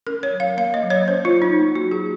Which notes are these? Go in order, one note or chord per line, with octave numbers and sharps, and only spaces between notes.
C#4 A#4
C#5
F#3
F5
A#3 F5
D#5
F#3
C#5
C#4 C5
F4
F#3
D#4
A#3
F#4
F#3
G#4